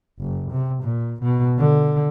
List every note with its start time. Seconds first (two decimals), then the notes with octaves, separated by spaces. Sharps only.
0.20 F#1
0.52 C3
0.83 A#2
1.22 B2
1.58 D3